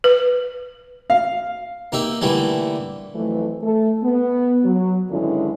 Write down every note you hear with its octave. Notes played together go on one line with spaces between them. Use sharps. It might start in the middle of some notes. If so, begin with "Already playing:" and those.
B4
F5
A#3 D#4 G4 E5
D3 E3 G3 A3 A#3
F2 E3 F#3 A3
A3 A4
B3
F#3
G2 D3 D#3 G#3 C#4 E4